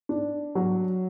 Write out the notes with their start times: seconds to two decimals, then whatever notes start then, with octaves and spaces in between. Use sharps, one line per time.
0.09 D4
0.55 F#3